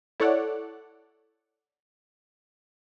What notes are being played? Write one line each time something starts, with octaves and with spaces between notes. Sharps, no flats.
E4 A4 C#5 D5 F#5